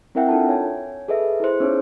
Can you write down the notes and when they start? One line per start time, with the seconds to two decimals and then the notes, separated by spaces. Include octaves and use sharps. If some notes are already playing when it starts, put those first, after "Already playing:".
0.15 C4 E4 A#4 E5 F#5 G5
0.29 D4 D#4 F4 A4 A5
0.49 C#5 G#5
1.08 G#4 A4 B4 D#5 E5
1.40 E4 G#4 C5
1.60 B3 C#4 D#4 G#4 C#5